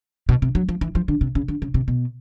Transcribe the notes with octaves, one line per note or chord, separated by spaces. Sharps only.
B2
C3
F#3
F3
E3
F3
D3
C3
C#3
D3
C#3
C3
B2